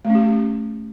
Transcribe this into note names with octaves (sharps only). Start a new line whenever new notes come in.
A3
C#4
G4